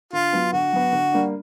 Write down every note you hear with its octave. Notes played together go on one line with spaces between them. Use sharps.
D3 F4
F#3 B3
D3 F#4
F#3 B3
D3
G3 A#3 D4